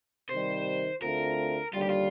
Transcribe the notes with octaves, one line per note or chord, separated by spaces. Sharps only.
C3 D#3 G3 C5
D2 D3 A3 C4 F4 A#4
D#2 D3 G3 F4
G4
F4